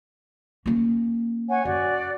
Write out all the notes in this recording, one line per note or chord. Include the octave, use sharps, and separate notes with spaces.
A#3 C#4
C#5 F#5 G#5
F#2 F#4 D5